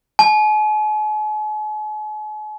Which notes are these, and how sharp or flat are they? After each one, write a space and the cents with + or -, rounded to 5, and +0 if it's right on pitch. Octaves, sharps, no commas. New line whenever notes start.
G#5 +45